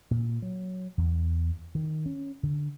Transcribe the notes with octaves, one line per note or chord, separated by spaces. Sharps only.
A#2
F#3
E2
D#3
C#4
D3